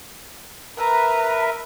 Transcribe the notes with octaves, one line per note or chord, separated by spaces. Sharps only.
A#4 B4 E5 A#5